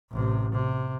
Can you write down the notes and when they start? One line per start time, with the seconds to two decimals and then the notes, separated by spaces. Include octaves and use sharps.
0.11 A1 C3
0.52 C3